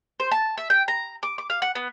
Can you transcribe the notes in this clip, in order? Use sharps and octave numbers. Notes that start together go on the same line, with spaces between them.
C5
A5
E5
G5
A#5
D6
D6
F5
F#5
B3